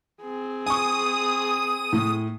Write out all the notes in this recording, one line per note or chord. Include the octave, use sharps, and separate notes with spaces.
C4 G#4
G#5 C#6 D#6
A2